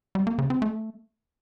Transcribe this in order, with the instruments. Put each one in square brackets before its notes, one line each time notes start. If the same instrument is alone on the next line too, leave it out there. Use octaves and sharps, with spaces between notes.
[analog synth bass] G3
A#3
C#3
C4
A3